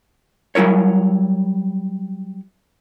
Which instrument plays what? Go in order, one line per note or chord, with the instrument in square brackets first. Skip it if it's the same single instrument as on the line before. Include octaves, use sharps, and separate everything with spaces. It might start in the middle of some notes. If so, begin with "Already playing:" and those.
[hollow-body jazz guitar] F#3 G3 E4 A#4 C#5